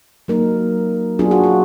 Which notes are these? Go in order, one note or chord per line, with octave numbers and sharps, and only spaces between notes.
F#3 A#3 D#4 A#4
F#3 B3 D4 F4 G#4
F#4
F4